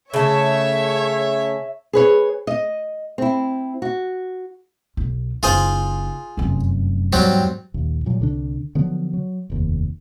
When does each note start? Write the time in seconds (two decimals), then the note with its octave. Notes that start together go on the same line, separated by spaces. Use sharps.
0.14 C#3 A3 C#5 E5
1.93 G#4 B4 C#5
2.47 D#5
3.18 C4 E4
3.82 F#4
4.97 B1
5.43 F#1 D#4 F4 G#4 C5
6.37 F1 F#2
7.13 E2 G#2 F#3 G3 C4
7.74 A#1 D#2
8.06 A#2 F#3 G3
8.20 C2 D3 D4
8.75 D3 F3 F#3 B3
9.14 F#3
9.50 F1 D#2